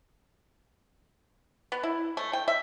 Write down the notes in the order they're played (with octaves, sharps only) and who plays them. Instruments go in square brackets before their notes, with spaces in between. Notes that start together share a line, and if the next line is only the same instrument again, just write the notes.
[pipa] B3
E4
A3
G5
E5